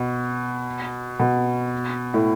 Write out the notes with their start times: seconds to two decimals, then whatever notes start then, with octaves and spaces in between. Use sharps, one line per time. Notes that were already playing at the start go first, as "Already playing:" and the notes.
Already playing: B2
1.19 B2
2.14 A2